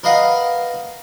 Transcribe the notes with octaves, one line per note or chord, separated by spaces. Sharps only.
A#4 B4 D#5 F5 F#5